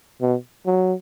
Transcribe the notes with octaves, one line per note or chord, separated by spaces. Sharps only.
B2
F#3